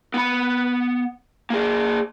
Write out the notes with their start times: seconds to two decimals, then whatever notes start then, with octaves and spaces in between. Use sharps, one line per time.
0.14 B3 B5
1.50 A#3 G#4